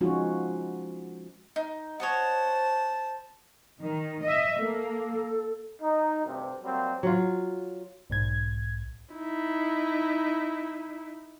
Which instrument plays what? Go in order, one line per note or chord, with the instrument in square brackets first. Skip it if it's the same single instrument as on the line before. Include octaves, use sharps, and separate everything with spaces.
[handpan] F3 G#3 C#4 D#4 F4 F#4
[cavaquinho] D#4
[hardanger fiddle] C5 A5 [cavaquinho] C#5 D#5 F#5
[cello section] D#3
D#5 E5
[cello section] A#3 [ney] A4
[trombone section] D#4
D2 G2 C3
F#3 G3 A#3 C4
[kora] F#3 F4
[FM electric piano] B1 G#2 G#6
[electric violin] D#4 E4